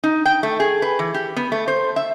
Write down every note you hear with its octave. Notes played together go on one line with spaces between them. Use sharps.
D#4
G5
A3
G#4
B4
E3
G4
B3
A3
C5
E5